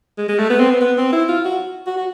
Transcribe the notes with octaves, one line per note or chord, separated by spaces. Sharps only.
G#3
G#3
A3
B3
C4
B3
B3
C4
E4
F4
F#4
F#4
F#4